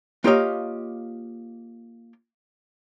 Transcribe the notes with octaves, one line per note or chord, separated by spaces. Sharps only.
A#3 F4 G4 C#5 D#5 F5